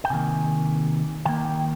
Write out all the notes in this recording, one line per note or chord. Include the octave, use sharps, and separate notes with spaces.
G5
C3 D#3 A#3 G#5
D#3 A#3 G5
G5